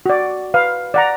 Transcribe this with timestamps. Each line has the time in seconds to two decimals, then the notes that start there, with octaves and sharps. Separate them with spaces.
0.06 F#4 D5
0.54 B4 F5
0.94 D5 F#5 A#5